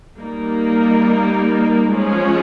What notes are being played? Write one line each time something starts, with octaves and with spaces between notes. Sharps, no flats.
G3 A#3 D#4 A#4
F3 G#3 C#4 G#4